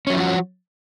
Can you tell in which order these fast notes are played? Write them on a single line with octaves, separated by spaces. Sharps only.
C#4 F#3 E4 F3 F#4